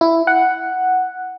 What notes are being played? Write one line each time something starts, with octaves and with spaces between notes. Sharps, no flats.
E4
F#5